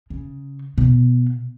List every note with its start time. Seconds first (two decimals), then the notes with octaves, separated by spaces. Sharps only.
0.10 C#3
0.78 B2